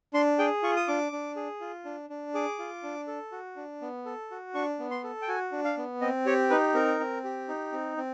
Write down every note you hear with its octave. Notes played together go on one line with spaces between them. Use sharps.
D4 C6
G#4 G5
F4 C#6
D#6
D4 D6
D4
G#4
F4
D4
D4
G#4 D6
F4
D4
A4
F#4
D4
B3
A4
F#4
D4 C#6
B3
C6
A4
G5
F#4 G#5
D4
F5
B3
C4 D#5
G4 C#5
D#4 B4
C4 A#4
C4
G4
D#4
C4
C4